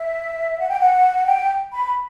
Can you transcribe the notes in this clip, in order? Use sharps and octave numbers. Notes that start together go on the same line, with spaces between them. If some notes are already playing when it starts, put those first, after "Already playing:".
Already playing: E5
F#5
G5
F#5
G5
B5